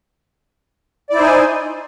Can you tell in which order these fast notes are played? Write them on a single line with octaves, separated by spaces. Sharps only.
D5 E4 C5 D#4 G#5